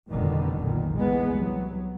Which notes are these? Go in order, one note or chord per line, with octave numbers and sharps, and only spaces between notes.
F1 C2 B2 D3 D#3
B1 A#2 D#3
E2 G#3 B3
C2 F#3